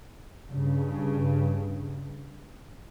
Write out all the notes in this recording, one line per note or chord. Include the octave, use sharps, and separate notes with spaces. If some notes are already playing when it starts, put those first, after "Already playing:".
G2 C#3